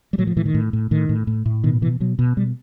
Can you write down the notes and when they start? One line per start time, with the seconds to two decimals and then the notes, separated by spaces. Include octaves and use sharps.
0.13 G3
0.18 A2 F#3
0.27 F3
0.36 A2 E3
0.46 D#3
0.54 A2
0.73 A2
0.91 A2 D#3
1.09 A2
1.27 A2
1.46 A2
1.64 B2 D#3
1.82 B2 E3
2.00 B2 F#3
2.19 B2
2.37 B2 G3